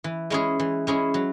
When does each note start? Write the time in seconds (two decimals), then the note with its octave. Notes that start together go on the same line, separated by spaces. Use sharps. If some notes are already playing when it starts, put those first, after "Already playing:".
0.04 E3
0.30 G#3 C#4 E4 G#4
0.59 E3
0.87 G#3 C#4 E4 G#4
1.14 F#3